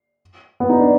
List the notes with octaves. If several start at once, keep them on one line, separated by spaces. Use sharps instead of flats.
B3
D#4
D4